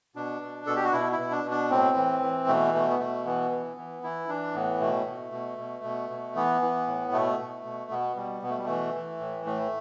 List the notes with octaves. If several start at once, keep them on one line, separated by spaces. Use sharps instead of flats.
B2 D4
B2
B2 A4
G4
F#4
B2 E4
E4
B2
D4
B2
D4
A2 C4
E3
E3
B2 A3
B2 A3
B3
B2 A3
E3 B3
E3
E3
E3 E4
E3 D4
A2 B3
B2 A3
B2
B2
B2
B2
B2
E3 B3
E3
A2
B2 A3
B2
B2
B2 B3
B2 G3
B2 B3
A3
G3
E3 A3
E3
A2
A2 A3